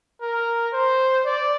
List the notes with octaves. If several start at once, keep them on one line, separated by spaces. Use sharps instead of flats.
A#4
C5
D5